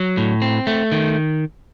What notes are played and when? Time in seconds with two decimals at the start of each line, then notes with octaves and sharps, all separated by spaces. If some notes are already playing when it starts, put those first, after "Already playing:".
Already playing: F#3
0.17 A2
0.42 C4
0.67 A3
0.92 D#3